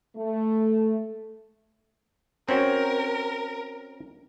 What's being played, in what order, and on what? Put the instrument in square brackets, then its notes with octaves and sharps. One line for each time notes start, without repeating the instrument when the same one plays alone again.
[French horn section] A3
[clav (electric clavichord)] C4 C#4 F#4 [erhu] A#4